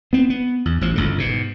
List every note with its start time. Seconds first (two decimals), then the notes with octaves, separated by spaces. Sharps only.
0.13 B3 C4
0.30 B3
0.65 E2
0.81 A1 F3
0.96 G1 C#2 D3
1.18 G#2 B2